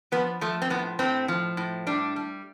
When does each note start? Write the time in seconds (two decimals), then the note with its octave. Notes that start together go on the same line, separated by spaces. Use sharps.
0.12 F3 B3
0.41 F3 A3
0.62 C4
0.70 A2 B3
0.99 A2 C4
1.28 F3
1.57 A2
1.87 G3 D4
2.16 G3